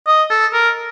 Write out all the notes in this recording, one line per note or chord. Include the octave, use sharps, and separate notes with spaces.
D#5
A4
A#4